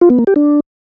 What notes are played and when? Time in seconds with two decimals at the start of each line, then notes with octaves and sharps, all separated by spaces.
0.01 F4
0.10 B3
0.19 A#3
0.27 G4
0.36 D4